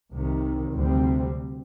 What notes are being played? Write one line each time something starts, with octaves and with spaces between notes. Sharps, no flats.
C2 C3 D#3
D2 C3 G3 C4